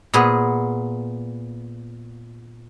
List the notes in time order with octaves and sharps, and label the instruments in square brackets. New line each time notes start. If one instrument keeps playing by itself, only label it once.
[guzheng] A#2 B3 G#4